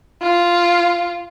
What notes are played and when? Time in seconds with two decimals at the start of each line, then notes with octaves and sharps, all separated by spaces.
0.22 F4